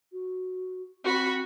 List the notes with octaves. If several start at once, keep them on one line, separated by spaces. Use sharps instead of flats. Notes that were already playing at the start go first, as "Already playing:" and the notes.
F#4
C4 F#4 B5